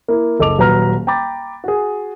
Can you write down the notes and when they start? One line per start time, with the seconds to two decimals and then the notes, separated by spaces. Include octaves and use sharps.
0.08 A#3 E4
0.39 F#1 A4 D#5 A5 D6 F7
0.58 D#1 F#3 B4 A#5 F6
1.07 G5 A#5 B5 D6 A6
1.64 F#4 G#4